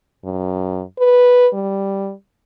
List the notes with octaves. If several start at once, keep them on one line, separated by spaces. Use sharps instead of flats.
F#2
B4
G3